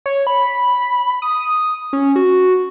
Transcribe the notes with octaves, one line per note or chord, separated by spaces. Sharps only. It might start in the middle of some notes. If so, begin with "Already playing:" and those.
C#5
B5
D#6
C#4
F#4